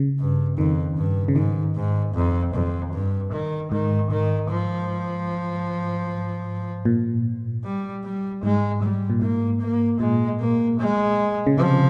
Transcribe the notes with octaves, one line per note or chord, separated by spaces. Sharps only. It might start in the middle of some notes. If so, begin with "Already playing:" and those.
Already playing: C#3
G2
F2 D#3
G2
C#3
G#2 D#3
G#2
F2
F2
G2
D#3
G#2 D#3
D#3
F3
A#2
G3
G3
G#2 G#3
G3
A#2
G#2 A#3
A#3
A#2 G#3
A#3
G#3
C#3
C3 F3